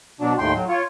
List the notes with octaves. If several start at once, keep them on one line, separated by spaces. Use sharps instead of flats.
B2 F#3 D4
D#2 A2 G5 C6
F#3
F4 C#5